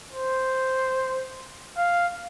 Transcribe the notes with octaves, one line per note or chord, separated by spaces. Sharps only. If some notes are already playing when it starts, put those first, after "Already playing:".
C5
F5